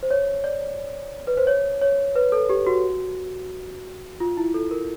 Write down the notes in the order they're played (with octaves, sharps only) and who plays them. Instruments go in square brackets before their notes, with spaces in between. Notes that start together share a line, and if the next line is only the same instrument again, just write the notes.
[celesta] C5
C#5
D5
B4
C5
C#5
C#5
B4
A4
G4
F#4
F4
E4
A4
A#4